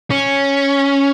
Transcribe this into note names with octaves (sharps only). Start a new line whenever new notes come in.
C#4